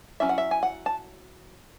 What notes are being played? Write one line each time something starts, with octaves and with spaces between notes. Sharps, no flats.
F#3 C#4 E4 E5
F#5
E5
G#5
F#5
A5